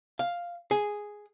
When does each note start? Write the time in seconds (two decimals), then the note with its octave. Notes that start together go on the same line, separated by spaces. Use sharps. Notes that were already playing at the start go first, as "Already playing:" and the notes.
0.19 F5
0.71 G#4